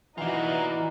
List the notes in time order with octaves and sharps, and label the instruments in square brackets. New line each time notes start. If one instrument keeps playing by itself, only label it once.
[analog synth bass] E3 [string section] D#4 F#4 [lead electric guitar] F4 D5